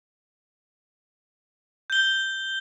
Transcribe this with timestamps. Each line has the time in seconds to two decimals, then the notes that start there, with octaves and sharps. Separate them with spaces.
1.90 G6 G7